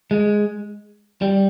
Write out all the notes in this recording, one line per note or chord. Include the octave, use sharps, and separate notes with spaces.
G#3
G3